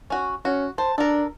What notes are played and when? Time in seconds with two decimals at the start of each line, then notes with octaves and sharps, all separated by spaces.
0.10 C#4 F#4
0.45 C#4 F#4
0.78 C5 A5
0.98 D4 A4 A#4